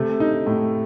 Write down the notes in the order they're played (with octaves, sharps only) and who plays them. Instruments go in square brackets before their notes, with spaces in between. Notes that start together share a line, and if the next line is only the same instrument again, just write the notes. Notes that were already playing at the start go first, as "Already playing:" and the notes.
Already playing: [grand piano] C3 A3
D#4
A2